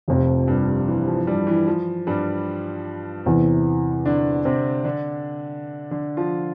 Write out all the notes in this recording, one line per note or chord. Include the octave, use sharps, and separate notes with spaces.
F1 F2 C3 F3
G2 G3
E3
F3
G2 G3
E3
F3
G2 G3
E2 C3 E3
D3 D4
C3 C4
D3 D4
D3 D4
F3 F4